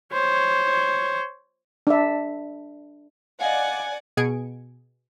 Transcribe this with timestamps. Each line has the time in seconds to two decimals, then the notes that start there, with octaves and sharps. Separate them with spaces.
0.13 C5 C#5
1.87 D4 E5
3.41 D5 D#5 F5 F#5 G#5
4.17 B2 G#4 G#5 G#6 C#7 D7